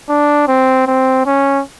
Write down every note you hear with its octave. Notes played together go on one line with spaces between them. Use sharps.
D4
C4
C4
C#4